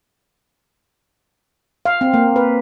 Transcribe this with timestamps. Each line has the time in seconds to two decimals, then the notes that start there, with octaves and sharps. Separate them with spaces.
1.86 F5
2.01 C4
2.14 A#3
2.36 B4